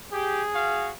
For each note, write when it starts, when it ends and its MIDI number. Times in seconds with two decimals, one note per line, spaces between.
0.13 0.43 67
0.13 0.93 68
0.54 0.92 66
0.54 0.92 77